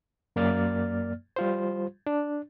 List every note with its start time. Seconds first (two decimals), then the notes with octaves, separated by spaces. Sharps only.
0.36 F#2 A#3 D5 F6 A6
1.36 G3 F4 C5
2.07 D4